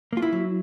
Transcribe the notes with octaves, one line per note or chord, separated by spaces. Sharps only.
A#3 F4
E4
F#3